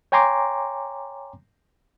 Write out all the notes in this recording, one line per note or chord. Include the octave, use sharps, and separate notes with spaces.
C#5 G5 G#5 A#5 C6 D6